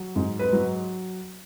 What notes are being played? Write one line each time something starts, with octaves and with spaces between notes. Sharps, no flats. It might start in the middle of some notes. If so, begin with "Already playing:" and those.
Already playing: F#3
G#2
B4
F#3